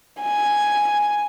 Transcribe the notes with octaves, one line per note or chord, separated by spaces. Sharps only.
G#5